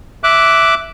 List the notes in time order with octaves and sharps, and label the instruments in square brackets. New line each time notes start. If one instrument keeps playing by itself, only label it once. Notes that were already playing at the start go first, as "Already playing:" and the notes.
[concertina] E5 D6 F#6